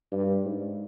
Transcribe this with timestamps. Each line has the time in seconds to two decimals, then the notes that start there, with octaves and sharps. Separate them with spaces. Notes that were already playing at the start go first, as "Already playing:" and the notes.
0.12 G2
0.45 G#2